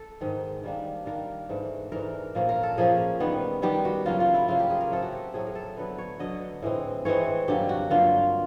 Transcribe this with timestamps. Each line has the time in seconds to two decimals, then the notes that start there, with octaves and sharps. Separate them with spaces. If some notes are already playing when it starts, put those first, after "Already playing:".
Already playing: A4
0.20 G#2 D#3 G#3
0.64 D#3 G3 A#3 D4
1.06 D#3 G3 A#3 D4 A#4
1.49 G#2 E3 A3 D4
1.92 G#2 E3 A3 D4 A#4
2.35 A#2 F3 A#3 C#4
2.49 A#4
2.63 A4
2.77 A#2 F3 A#3 C#4 G#4
3.20 D#3 G3 B3
3.62 D#3 G3 B3 G4
3.85 F#4
4.06 C#3 F#3 A#3 C#4 F4
4.20 F4
4.34 E4
4.48 C#3 F#3 A#3 C#4 F4
4.59 G4
4.70 G#4
4.81 A#4
4.90 A2 F#3 A3 C4 A4
5.02 F#4
5.13 G4
5.34 A2 F#3 A3 C4 G#4
5.47 A#4
5.55 A4
5.77 D3 F#3 B3 B4
5.98 C#5
6.19 D3 F#3 B3 D#5
6.62 A2 E3 G#3 C4
7.05 A2 E3 G#3 C4 C#5
7.48 G2 D3 F#3 A#3 G4
7.69 F#4
7.90 G2 D3 F#3 A#3 F4